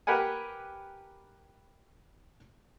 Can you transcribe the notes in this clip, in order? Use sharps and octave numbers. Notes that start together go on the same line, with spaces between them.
G4 A#4 B4 F#5 G#5